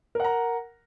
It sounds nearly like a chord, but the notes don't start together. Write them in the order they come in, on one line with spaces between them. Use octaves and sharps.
A#4 F#5 A#5